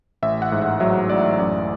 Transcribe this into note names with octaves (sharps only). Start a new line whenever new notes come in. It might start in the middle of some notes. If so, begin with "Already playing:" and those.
A1 E5
F#5
G#2
E5
F#3 E5
A1 D5
F#2 D5